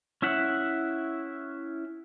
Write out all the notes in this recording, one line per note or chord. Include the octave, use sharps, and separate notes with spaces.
C#4 E4 E5 F#5